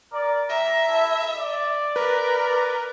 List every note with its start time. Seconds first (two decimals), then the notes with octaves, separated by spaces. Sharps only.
0.12 A#4 D5
0.50 G3 E5 A#5
0.87 E4 A4
1.35 D5
1.96 A#4 B4